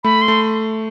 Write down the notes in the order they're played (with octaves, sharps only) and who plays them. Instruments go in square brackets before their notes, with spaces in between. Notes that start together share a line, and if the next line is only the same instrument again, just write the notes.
[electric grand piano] A3 [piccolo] B5
[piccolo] C6
[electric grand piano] A3